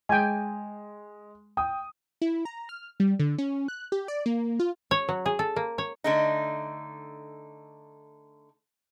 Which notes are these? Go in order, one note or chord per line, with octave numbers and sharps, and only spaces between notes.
G#3 G5 G#5
G5 D#6
E4
A#5
F6
G3
D3
C#4
F#6
G4
D5
A#3
F4
C#5
F#3
G#4
A4
A#3
C#5
D3 A3 D#4